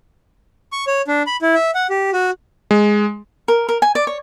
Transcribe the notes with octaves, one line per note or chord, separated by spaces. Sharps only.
C#6
C#5
D4
B5
E4
E5
F#5
G4
F#4
G#3
A#4
A#4
G#5
D5
C#5